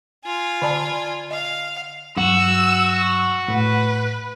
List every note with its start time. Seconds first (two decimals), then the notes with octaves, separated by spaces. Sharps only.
0.25 F4 G#5
0.62 D3 D5 A5
1.31 D#5 F5
2.18 G2 F#3 F#4 E6
3.48 A2 B4